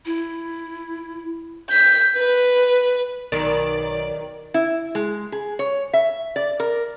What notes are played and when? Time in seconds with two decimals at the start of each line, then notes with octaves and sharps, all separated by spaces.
0.06 E4
1.70 G6 B6
2.17 B4
3.32 B1 D#3 D5
4.54 E4
4.95 G#3
5.32 G#4
5.59 C#5
5.93 E5
6.36 D5
6.60 A#4